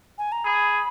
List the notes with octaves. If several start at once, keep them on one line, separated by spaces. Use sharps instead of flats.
G#5
A#5
G#4 B5